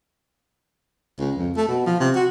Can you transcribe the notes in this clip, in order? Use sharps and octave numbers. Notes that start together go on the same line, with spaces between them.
C#2
F2
A3
B2
F3
C3
F#4